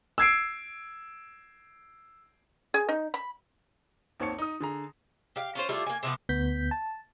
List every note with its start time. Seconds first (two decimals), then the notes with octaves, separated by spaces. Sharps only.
0.18 E6 G#6 C7 D7
2.74 G#4
2.89 D#4
3.14 B5
4.20 G#1 D#2 C4 C#5 A5 C#7
4.38 D#4 D#6
4.60 D3 G#4 A#5
5.36 G4 F5
5.55 C#4 F4 C5
5.69 G3 A3 E4 F4
5.86 A#3 G#5
6.03 C3 F3 B3
6.29 D2 B3 G6 B6
6.71 A5